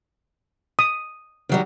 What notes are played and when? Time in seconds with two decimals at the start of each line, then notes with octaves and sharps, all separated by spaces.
0.79 D#6
1.49 D#3 F#3 G3